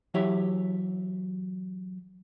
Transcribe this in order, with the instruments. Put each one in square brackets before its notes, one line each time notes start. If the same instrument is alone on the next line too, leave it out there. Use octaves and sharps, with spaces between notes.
[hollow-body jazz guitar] E3 F#3 E4 G4 C#5 E5